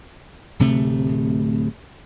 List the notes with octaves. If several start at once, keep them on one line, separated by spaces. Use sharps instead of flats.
D1 C3 A3